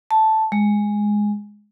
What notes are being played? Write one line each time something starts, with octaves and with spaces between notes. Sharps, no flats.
A5
G#3